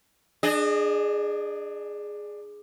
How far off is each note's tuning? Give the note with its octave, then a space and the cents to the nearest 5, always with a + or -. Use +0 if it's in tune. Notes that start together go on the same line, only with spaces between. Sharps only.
D4 +15 G#4 +0 D#5 -25